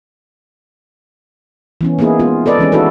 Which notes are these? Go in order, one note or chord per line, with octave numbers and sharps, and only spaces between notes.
E3 B3 C#4
A#3 B3 D#4 E4 G#4
G#3 B3 F4
A4 B4 D5 D#5
D#3 E3 G#3 C#4
C#4 D#4 E4 F#4 A4 B4